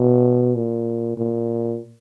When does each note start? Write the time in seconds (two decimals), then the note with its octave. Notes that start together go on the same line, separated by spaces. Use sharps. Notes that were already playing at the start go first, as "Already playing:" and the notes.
Already playing: B2
0.56 A#2
1.17 A#2